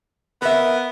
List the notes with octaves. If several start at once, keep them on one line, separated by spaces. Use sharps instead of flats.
B3 A#4 E5